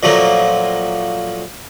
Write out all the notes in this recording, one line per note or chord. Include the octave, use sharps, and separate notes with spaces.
A#2 F3 F#3 A3 A#3